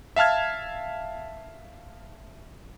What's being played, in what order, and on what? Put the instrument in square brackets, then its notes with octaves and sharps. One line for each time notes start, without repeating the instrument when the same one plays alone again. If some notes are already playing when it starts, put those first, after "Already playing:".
[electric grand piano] E5 F5 A5 F6 G#6